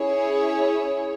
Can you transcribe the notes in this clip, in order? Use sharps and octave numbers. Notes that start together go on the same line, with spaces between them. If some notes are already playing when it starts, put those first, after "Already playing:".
Already playing: C#4 E4 G#4 C#5